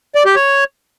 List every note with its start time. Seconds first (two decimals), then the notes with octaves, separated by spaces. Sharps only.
0.15 D5
0.25 G4
0.36 C#5